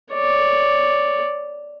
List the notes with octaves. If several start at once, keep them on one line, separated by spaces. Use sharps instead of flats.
C#5 D5